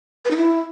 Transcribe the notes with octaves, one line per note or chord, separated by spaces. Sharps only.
B4
D#4
E4